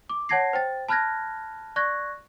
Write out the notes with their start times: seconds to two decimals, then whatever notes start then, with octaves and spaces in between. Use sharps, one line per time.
0.09 D6
0.29 C#5 F#5 A5 G#6 A#6 C7
0.53 C5 G5 A6
0.89 A5 B5 F6 F#6 G#6 A#6
1.76 D5 C#6 F#6 G#6 A#6